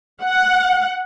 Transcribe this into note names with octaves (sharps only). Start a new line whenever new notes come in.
F#5